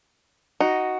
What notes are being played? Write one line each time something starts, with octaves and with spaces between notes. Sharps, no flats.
D#4 F#4